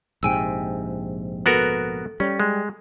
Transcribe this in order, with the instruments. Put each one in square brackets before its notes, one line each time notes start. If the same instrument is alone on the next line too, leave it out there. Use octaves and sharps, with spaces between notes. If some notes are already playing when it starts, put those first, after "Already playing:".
[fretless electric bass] A#1 G#2 C3 [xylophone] G5 G#5 E6
[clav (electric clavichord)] B3 F#4 A#4 [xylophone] A4
[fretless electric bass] G3 [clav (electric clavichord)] C#4
[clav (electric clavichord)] G#3